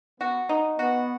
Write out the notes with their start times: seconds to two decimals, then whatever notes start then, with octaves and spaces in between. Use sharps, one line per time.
0.20 B3 F#4
0.49 D#4
0.79 B3 F#4